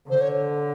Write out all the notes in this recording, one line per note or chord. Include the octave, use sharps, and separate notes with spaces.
D3 C5
C#5